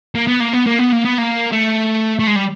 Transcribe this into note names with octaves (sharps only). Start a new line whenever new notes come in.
A#3
B3
A#3
B3
A#3
B3
A#3
B3
A#3
A3
A3
G#3
G3